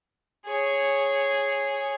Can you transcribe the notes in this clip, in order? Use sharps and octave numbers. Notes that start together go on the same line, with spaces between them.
G#4 C#5